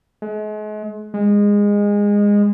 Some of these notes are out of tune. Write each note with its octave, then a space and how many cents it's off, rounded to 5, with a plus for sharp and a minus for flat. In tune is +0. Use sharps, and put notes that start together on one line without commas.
G#3 +40
G#3 -20